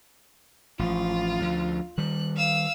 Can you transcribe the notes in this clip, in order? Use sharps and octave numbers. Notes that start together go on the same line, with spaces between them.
A1 F3 F4
D2 F3
D#3 G3 F#6
F5 E6